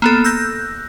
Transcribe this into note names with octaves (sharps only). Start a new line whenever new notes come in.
A#3 B3 A4
E6 F#6 G6 A#6